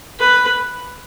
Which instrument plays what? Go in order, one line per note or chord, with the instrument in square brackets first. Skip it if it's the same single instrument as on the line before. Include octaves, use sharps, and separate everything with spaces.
[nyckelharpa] B4